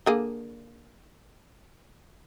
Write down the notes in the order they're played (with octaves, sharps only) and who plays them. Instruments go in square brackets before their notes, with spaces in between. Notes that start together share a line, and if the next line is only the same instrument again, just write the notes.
[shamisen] D3 A#3 G#4